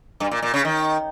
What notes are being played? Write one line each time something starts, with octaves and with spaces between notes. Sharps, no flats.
G2
A#2
A#2
C#3
D#3